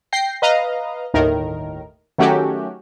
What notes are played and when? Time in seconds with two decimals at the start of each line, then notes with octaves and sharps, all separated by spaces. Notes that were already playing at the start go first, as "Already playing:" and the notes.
0.13 G5 G6 A#6 C7
0.42 B4 D#5 F5 A#5
1.14 G1 D#2 A2 D#3 A#4
2.19 D#3 F#3 A3 C#4 F#4 G4